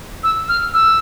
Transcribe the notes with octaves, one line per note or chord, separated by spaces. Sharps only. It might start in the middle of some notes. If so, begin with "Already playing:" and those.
E6
F6
E6